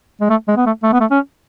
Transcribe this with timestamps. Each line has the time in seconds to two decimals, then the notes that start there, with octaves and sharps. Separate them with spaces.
0.21 G#3
0.30 A3
0.48 G#3
0.57 B3
0.66 A3
0.83 A3
0.93 B3
1.00 A3
1.11 C#4